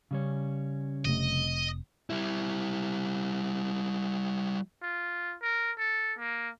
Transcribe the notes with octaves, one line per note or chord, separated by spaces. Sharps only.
C#3 G3 C#4
F1 C3 A3 D#5
G3 E4
F4
A#4
A4
A#3